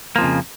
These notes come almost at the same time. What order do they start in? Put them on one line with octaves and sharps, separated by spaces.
A#3 F3 F2 C#3